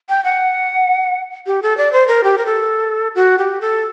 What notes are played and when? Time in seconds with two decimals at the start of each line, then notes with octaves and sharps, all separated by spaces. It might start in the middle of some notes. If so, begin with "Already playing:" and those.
0.09 G5
0.24 F#5
1.47 G4
1.63 A4
1.77 D5
1.93 C5
2.08 A#4
2.24 G4
2.38 A#4
2.46 A4
3.15 F#4
3.38 G4
3.61 A4